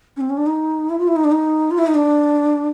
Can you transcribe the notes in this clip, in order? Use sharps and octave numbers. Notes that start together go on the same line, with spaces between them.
C#4
C4
C#4
D4
D#4
E4
F4
E4
D#4
D4
D#4
F4
E4
D#4
D4